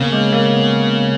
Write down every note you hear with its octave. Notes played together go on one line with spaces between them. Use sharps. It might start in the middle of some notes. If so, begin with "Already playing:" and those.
Already playing: C#3 A#3 B3
G#3
A#3
B3